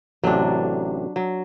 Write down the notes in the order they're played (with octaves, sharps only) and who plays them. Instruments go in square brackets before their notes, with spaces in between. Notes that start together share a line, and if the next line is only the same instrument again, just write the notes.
[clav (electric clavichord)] A1 C3 [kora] F#3 D4
[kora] F#3